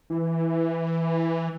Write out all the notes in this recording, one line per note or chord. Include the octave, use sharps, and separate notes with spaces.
E3